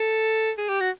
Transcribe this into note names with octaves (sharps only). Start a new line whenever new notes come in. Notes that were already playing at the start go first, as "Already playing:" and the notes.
Already playing: A4
G#4
G4
F#4